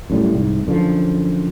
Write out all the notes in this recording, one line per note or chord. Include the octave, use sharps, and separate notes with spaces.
F#2 A2 G3
C2 G#2
F#2 D3 E3 F3